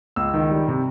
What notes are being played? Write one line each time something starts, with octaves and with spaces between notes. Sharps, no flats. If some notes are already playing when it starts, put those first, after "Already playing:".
C#2 E6
D#3
G3
C3